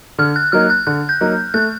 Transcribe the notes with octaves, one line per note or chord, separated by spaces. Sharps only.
D3 F6
F#6
F#3 A#3 D#4 F6
F#6
D3 F#6
G6
F#3 A#3 D#4
A3 F#6